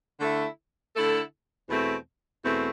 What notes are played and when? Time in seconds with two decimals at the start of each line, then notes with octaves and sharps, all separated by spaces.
0.20 D3 A3 E4 A4
0.94 D3 A3 E4 A4
1.69 E2 B2 A3 C4
2.44 E2 B2 A3 C4